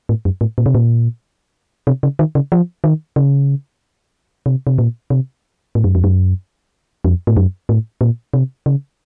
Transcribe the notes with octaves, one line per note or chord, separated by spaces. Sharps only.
A2
F#2
A2
A#2
C3
A#2
C3
C#3
D#3
C#3
F3
D#3
C#3
C3
C3
A#2
C3
A2
F#2
F2
F#2
F2
A2
F#2
A2
A#2
C3
C#3